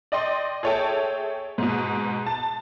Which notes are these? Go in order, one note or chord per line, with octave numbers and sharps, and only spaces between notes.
D5 D#5 G5 C6
G#4 A4 C#5 E5 G5 A5
G#2 B2
A5